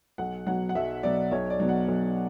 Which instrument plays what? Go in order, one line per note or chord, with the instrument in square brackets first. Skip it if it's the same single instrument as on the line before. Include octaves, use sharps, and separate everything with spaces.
[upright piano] B1 F#5
B2 F#3 F#5
F#5
B1 E5
B2 F#3 D5
B1 C#5
D5
B2 F#3
F#5
B1